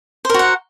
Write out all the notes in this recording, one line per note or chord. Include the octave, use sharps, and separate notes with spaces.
F#4 A#4 C5 F#5